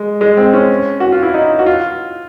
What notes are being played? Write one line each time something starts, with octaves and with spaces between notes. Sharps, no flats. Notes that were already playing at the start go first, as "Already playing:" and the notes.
Already playing: G#3
G#3
C4
C#4
F#4
F4
E4
D#4
F#4
F4